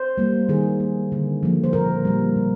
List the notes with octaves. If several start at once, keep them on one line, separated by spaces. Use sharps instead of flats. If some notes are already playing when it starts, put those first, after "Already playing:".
Already playing: C5
G3 A#3
D#3 G#4
A#3
D3
F3 A#3
C5
A#2 A#4
G3 A#3
A#2